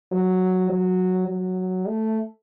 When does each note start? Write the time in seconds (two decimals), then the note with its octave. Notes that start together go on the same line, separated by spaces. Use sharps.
0.12 F#3
0.70 F#3
1.28 F#3
1.87 A3